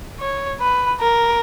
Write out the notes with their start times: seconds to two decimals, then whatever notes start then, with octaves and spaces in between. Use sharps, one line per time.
0.20 C#5
0.60 B4
1.01 A#4